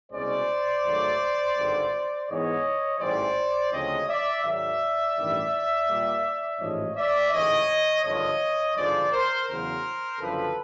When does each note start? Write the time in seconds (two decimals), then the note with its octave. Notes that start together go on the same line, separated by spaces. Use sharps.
0.12 C2 B2 G#3 C#4 C5 D5
0.84 G#2 D#3 F#3 A3
1.55 G#1 G2 D3
2.28 G#2 E3 G#3 B3 C#5 D#5
2.99 A1 G#2 E3 G3 C5 D5
3.72 D2 C#3 F3 G#3 C4 C#5 D#5
4.08 D5 E5
4.43 G#2 D#3 F#3 D5 E5
5.16 A1 G2 D#3 G3
5.88 A#2 G3 A#3
6.60 A1 G#2 F3 C#5 D#5
6.96 D5 E5
7.32 A1 G#2 E3 C#5 D#5
8.04 G#1 G2 D3 F3 C#5 D#5
8.76 G#1 G2 D3 F3 G#3 C5 D5
9.12 A#4 C5
9.48 E2 C#3 F#3 A#4 C5
10.20 F#1 F#2 D3 F3 A4 B4